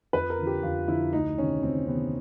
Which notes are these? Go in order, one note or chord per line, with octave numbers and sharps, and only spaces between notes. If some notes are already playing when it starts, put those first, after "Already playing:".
F2 B4
A#4
D3 F3
G4
F2 F4
D3 F3 E4
D2 D#4
C3 D#3 C#4
D2 C4
C3 D#3 B3